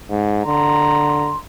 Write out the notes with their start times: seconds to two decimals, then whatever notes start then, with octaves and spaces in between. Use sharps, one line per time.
0.10 G#2
0.46 D3 A#5 C6